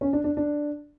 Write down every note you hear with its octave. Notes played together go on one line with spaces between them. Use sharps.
C#4
D4
D4
D4